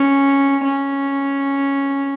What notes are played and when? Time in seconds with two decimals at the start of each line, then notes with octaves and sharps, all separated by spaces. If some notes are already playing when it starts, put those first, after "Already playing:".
Already playing: C#4
0.64 C#4